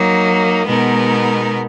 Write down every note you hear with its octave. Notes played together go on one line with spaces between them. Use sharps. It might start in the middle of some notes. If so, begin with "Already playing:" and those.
Already playing: F#3 A#3 D#4
B2 G#3 B3 D#4 A#4